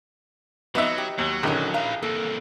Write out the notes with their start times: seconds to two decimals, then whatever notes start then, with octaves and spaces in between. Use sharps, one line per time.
0.75 F2 F#3 B3 D#4 E5
0.98 G4
1.19 D#2 F#3
1.43 A#1 D3 D#3 C#4
1.74 E4 F5 A#5
2.03 C2 A#3 A4